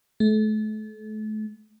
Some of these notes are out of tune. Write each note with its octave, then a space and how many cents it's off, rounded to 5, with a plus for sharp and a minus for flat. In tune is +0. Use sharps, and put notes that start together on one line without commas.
A3 -35